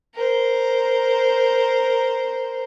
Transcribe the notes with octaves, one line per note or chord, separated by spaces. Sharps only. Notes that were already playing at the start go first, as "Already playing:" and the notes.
A#4 C5